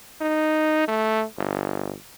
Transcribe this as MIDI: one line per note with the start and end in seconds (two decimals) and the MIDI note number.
0.21 0.85 63
0.88 1.24 57
1.38 1.93 31